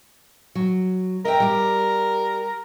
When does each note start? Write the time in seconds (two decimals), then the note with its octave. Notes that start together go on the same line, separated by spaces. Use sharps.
0.55 F#3
1.25 A#4 D#5 E5 G5
1.40 G3 G4